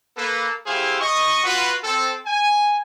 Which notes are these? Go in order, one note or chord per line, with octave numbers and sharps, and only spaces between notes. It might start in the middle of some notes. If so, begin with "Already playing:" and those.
A#3 A4 B4
A3 E4 G4 G#4 C5 F5
D#5 C#6
F4 F#4 B4
C4 A4
G#5